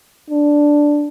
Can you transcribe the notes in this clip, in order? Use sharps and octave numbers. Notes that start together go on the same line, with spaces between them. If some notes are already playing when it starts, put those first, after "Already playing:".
D4